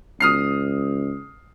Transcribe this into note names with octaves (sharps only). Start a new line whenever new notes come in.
C#2 D#6 F6 C7